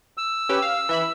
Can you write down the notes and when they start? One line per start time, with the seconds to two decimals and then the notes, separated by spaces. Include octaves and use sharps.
0.18 E6
0.49 C#4 G4 B4
0.62 F5
0.89 E3 E5 B5